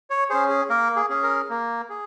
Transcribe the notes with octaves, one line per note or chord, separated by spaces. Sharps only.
C#5
C#4 G#4 C5
G#4
A#3 A#4
G#4
C#4 G#4
A#4
A#3
G#4